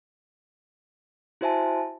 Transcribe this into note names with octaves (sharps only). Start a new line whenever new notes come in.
E4 F#4 C5 E5 G#5 A5